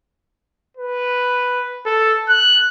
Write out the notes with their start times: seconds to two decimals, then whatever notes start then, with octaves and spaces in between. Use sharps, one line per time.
0.77 B4
1.86 A4
2.29 F#6